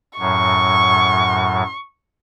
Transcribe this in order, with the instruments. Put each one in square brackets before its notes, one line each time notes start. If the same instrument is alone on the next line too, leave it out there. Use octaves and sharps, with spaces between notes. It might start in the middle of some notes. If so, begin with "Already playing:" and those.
[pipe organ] F#2 A2 F#3 [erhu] C#6